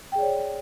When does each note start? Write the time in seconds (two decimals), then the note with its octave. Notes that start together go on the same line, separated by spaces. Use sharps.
0.12 G5
0.15 G#4
0.18 D5
0.22 C#5